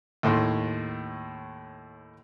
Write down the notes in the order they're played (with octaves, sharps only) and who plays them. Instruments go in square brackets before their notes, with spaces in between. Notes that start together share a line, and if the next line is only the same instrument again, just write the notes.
[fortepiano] D#2 A2 C6